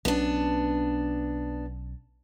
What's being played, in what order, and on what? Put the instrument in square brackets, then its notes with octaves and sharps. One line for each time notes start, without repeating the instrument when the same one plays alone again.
[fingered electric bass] B1 C#4 [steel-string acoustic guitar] B3 D4